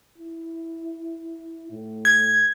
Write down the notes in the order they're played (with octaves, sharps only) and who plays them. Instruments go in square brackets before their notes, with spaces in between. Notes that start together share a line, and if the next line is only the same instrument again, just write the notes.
[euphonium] E4
A2
[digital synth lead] G#6